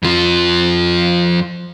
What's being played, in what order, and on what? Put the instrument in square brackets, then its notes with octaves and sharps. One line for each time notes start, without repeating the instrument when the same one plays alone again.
[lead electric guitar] F2 F3